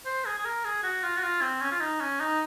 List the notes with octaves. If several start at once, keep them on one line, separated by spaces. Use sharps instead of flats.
C5
G#4
G#4
A#4
G#4
F#4
F4
F#4
F4
C4
C#4
F4
D#4
C#4
D#4